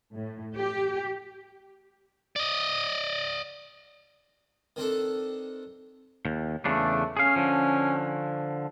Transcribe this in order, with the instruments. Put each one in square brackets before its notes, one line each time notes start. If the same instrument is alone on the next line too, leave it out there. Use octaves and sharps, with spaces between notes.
[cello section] A2
G4
[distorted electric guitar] D5 D#5
[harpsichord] D#3 C4 D4 A4
[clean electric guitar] D#2
[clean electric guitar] E2 C#3 D4 [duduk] A3
[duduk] C#4 [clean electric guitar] G#4 F5
[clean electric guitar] D3 F3